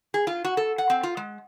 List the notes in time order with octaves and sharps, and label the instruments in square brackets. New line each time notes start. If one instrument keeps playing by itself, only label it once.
[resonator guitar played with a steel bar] G#4
F4
F#4
A4
F#5
C4
F4
G#3